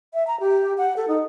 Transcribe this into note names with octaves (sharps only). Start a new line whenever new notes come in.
E5
A#5
G4
F#5
A4
D#4